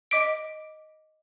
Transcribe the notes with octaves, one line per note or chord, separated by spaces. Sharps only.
D#5 D6 B6 D7